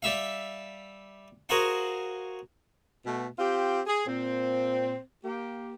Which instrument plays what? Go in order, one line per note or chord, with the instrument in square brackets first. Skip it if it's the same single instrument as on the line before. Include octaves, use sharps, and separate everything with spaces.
[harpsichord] G3 E5 F5
F#4 G#4 A#4 C5 F5 F#5
[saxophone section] B2 A3
C4 F4 G4
G#4
A#2 C4
A#3 G4